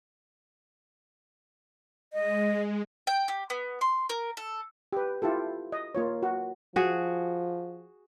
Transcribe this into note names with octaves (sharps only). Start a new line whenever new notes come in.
G#3 D#5
G5
G4
B3
C6
A#4
A4
G4 B4
E4 F4 G4 A4
D#5
A#3 F4 C#5
F#4
F3 F#4 G#4